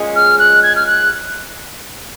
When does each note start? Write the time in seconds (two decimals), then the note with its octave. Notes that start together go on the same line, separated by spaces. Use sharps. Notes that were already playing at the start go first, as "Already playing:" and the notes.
Already playing: A#2 G#3 C#4
0.16 F6
0.39 F#6
0.63 G#6
0.76 F6
0.86 F#6